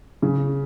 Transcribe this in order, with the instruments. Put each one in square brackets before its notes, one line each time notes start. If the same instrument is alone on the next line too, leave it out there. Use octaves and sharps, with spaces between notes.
[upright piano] C#3